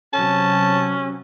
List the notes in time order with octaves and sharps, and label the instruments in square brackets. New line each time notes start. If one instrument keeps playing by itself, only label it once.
[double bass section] C3 F#3 [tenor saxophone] C#4 [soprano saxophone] A5